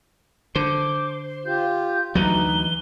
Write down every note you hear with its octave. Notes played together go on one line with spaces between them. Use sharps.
D3 C5 D6
F4 G4 G6
D2 E3 F#3 D#4 B4 G7